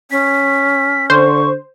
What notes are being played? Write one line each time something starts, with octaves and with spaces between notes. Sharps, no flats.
C#4 B6
D3 C5 C#6